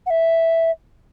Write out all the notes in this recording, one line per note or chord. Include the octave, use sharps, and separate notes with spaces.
F#5
E5